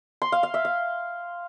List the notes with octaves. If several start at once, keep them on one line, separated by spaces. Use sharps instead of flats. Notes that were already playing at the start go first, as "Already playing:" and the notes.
C6
F5
F5
E5
F5